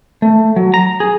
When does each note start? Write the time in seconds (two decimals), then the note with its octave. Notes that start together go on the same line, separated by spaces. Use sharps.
0.22 A3
0.56 F#3
0.74 A#5
1.00 G#4